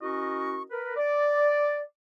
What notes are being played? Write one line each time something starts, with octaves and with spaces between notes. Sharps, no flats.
C#4 E4 F#4 A#4 D#5 C#6
A#4 B4
D5